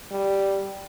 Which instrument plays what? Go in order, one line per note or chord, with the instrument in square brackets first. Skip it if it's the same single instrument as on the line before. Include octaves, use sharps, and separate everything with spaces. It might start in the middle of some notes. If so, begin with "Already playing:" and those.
[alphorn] G3